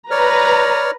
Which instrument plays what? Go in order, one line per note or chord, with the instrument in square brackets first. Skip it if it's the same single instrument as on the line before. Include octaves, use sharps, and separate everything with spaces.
[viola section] B4 A#5 [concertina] C#5 D5 F6